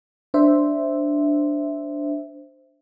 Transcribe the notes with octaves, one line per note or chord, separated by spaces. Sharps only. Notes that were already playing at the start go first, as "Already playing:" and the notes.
D4 C5 E5